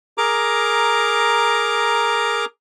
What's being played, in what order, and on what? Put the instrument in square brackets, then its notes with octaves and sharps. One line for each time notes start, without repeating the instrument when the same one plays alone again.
[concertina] G#4 A#4 A#5 D6